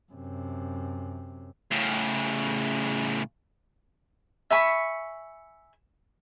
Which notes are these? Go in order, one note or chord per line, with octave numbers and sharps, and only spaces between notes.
F#2 C3
A2 C#3
E5 G#5 B5 C#6